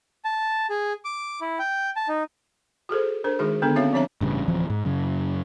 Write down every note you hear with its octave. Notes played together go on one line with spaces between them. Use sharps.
A5
G#4
D6
E4
G5
A5
D#4
F#4 G#4 A4 C5
D4 A#4 C5
D#3 G#3 D#4 F#4 G#4
D3 B3 D4 A4 B4
C4 C#4 F#4 C#5 E5 F5
F3 C4 D4 C#5 E5 A#5
A1 G2 C#3
D1 E3 F3 C4
G#2
F#2 C#3